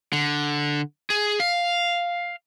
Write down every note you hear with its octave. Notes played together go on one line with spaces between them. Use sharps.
D3
G#4
F5